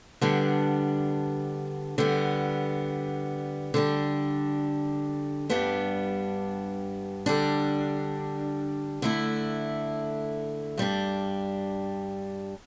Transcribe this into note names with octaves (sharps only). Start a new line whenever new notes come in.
D3 G3 B3 D4
D3 G3 B3
D3 G3 D4
G2 G3 B3 D4
D3 G3 D4
D3 A3 E4
G2 G3 D4